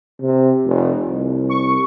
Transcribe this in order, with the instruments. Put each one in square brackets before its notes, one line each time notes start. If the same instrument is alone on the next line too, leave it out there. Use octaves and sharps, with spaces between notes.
[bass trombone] C3
F1
C2
[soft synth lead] C#6